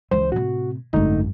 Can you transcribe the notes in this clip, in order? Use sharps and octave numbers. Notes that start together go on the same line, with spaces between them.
C#2 E3 C5
A2 C3 F#4
G#1 F#2 D3 A3 D#4